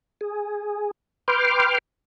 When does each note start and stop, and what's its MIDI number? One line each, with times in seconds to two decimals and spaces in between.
0.21 0.91 68
1.28 1.78 71
1.28 1.78 79
1.28 1.78 84
1.28 1.78 86
1.28 1.78 89